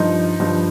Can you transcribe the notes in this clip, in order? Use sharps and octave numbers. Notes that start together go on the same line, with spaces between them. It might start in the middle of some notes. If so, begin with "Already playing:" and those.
Already playing: G2 F3 D#4
G2 F3